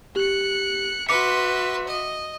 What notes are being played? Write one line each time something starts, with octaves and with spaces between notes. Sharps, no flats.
G4 F#6 C#7
F#4 B4 E5 C6 D6 C#7
D#5